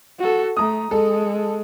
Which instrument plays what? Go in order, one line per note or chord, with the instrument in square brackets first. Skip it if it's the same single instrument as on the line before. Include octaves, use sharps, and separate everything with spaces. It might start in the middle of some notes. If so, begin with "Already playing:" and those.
[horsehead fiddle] F#4 A4
[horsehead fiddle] A3 [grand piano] A#5 D#6
[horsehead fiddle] G#3 [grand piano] A4